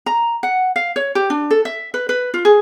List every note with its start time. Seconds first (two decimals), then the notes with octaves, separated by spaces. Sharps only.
0.06 A#5
0.43 F#5
0.76 F5
0.96 C#5
1.15 G4
1.30 D4
1.51 A4
1.65 E5
1.94 B4
2.09 B4
2.34 F4
2.45 G#4